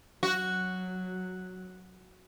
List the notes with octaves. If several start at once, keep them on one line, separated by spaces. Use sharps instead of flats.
F#3 F#4